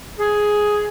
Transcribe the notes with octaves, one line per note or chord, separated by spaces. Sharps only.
G#4